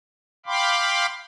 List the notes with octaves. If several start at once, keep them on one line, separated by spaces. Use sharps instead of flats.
F5 G5 B5 C6 D6